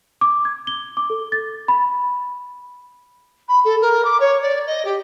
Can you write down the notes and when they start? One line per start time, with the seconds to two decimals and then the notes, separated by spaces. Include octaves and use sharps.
0.21 D6
0.45 G#6
0.67 G7
0.97 D6
1.10 A4
1.32 A6
1.68 B5
3.48 B5
3.64 A4
3.82 A#4
4.04 D6
4.20 C#5
4.42 D5
4.67 D#5
4.85 G4